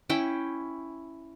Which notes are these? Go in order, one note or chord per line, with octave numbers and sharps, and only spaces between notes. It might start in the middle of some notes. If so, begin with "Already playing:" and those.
C#4 E4 G5